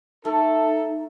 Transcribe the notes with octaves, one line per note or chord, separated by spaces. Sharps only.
A3 D#4 A4